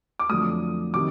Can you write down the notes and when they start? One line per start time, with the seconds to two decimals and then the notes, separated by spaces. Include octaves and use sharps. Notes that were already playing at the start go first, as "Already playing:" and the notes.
0.19 D6
0.29 F2 D3 F#3 A3 D#6
0.94 C3 D#3 F#3 D6